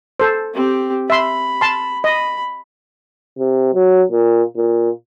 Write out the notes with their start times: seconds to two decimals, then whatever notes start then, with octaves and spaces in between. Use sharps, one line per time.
0.20 A4 C5
0.54 C4 G4
1.10 E5 B5 C6
1.61 A5 C6
2.04 D#5 B5
3.38 C3
3.74 F#3
4.11 A#2
4.57 A#2